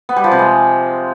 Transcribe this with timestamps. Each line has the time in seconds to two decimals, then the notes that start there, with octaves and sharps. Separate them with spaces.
0.09 B3
0.16 G3
0.24 F3
0.31 C3
0.39 G#3